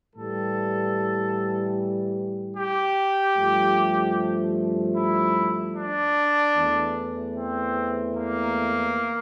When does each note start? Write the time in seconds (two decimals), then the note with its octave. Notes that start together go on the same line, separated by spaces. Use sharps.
0.15 A2 E3 G3 A4
2.56 G4
3.36 G2 F3 A3
4.95 E4
5.76 D4
6.55 E2 E3 A3
7.36 C4
8.16 A#3